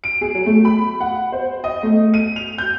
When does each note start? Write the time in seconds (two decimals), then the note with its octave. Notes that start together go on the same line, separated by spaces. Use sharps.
0.04 D7
0.21 G#4
0.35 F#3
0.46 A3
0.65 B5
1.00 F#5
1.32 C5
1.64 D#5
1.83 A3
2.14 D#7
2.36 F7
2.58 G6